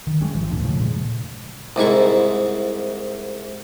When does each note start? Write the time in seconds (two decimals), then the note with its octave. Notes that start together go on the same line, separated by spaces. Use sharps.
0.07 D#3
0.21 G3 G#3 C#4
0.35 G#1 E3 F3
0.50 D2 A#2 D3
0.64 F1 C#3 F3 A3
0.79 A#2 G#3
1.76 C2 G#2 E4 C#6